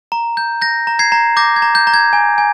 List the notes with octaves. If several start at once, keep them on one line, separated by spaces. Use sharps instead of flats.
A#5
G6
G6 A#6
A#5
G#6 C7
A#5
D6 G6 A#6
G#6
A#5
G6
A#5
G#6
G#5
G#5